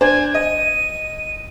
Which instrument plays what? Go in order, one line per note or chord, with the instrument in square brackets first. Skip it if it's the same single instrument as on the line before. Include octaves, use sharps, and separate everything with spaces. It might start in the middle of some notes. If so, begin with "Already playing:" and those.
[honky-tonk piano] D4 C5 [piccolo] G#5
[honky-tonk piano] D#5 [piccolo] D#7